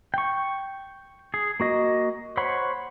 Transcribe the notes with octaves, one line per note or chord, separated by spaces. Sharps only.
G5 C#6
G#4
A#3 F#4 D#5
C5 C#5 F#5 B5